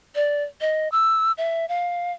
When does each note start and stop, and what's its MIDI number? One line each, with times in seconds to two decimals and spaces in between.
0.15 0.43 74
0.61 0.88 75
0.92 1.32 88
1.38 1.66 76
1.69 2.12 77